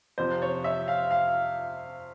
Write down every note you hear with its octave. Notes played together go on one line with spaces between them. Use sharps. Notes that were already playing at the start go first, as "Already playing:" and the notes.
F2 C3 F3 C5
C#5
E5
F5
F5